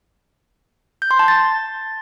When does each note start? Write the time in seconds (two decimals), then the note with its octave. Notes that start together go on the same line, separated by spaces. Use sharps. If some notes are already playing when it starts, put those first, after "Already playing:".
1.02 G6
1.11 C6
1.19 A5
1.28 A6